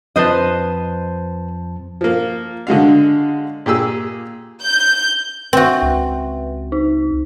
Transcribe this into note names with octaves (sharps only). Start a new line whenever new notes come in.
F2 F3 B4 C5 D#5 A5
F3 A#3
D3 G#3 F#4 F5
A#2 G4 G#4 E6
G6
C4 F#4 B4 E5
C#2
D#4